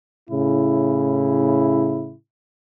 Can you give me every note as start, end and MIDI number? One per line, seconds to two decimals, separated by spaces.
0.30 2.15 45
0.30 2.15 49
0.30 2.15 64